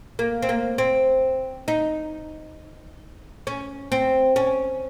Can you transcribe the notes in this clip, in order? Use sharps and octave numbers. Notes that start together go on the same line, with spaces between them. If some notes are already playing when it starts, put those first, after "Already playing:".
A#3
C4
A#3
C4
D#4
C#4
C4
C#4